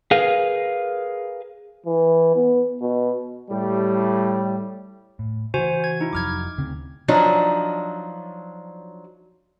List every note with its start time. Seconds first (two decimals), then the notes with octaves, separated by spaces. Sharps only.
0.11 G#4 A#4 B4 F5
1.86 E3
2.36 B3
2.81 B2
3.50 A2 G3
5.19 A2
5.54 C#3 E3 F#4 C5 G#5
5.80 F#4 G#6
6.01 D#4 E4
6.13 F1 F2 F#3 D6 F6 G#6
6.58 D2 C#3 C4
7.08 F3 F#3 D4 D#4